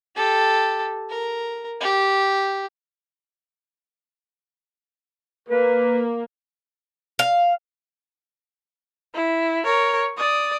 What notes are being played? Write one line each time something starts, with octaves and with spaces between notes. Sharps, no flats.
G4 A4
A#4
G4
A#3 B4
F5
E4
A#4 C#5
D5 D#6